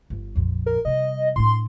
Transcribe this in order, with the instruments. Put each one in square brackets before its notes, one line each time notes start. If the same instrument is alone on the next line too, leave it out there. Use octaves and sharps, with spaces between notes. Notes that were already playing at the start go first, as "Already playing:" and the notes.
[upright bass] G1
A#1 F2
[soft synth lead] A#4
[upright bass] C3 G3 [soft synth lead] D#5
[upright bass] A2 D4 [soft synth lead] C6